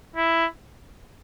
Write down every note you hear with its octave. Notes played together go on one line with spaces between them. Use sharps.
E4